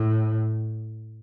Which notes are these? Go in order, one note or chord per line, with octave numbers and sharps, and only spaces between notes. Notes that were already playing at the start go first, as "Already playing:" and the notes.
Already playing: A2